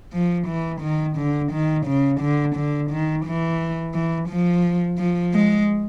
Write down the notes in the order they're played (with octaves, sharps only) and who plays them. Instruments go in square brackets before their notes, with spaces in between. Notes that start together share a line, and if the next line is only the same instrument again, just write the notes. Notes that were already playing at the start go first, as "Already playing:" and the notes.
[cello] F3
E3
D#3
D3
D#3
C#3
D3
D3
D#3
E3
E3
F3
F3
G#3